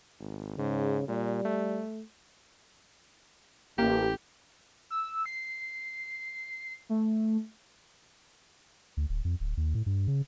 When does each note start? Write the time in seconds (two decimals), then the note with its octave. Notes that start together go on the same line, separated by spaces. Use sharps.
0.20 G#1
0.58 G#2 C#3
1.08 A#2 G3
1.45 A3
3.78 A1 A#3 G4
4.90 E6
5.26 C7
6.89 A3
8.97 D2
9.09 D1
9.25 F2
9.40 D1
9.57 D#2
9.75 A2
9.86 G2
10.08 C#3